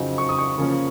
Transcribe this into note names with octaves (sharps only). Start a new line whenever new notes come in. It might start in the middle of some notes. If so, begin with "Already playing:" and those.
Already playing: F2 C#3 F#3 C4 D#4
C#6
D#6
C#6
C#3 F3 A#3 C#4